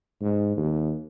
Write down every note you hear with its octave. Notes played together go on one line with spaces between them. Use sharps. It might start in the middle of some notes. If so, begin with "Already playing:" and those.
G#2
D#2